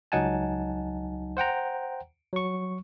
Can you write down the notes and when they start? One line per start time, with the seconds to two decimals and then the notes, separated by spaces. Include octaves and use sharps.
0.12 C#2 F#3 D#4 F#5 G#5 A5
1.37 C5 F#5 G5 A#5
2.33 F#3 C#6